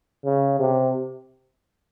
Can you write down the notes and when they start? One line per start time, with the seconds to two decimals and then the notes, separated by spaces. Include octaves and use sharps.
0.24 C#3
0.59 C3